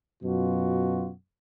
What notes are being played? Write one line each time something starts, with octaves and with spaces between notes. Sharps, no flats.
F#2 B2 F4 F#4